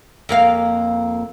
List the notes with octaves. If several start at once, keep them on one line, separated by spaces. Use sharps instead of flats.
F2 A#3 F5